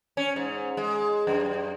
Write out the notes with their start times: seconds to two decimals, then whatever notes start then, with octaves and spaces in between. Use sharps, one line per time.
0.17 C#4
0.36 G#2
0.77 G#3
1.27 F#2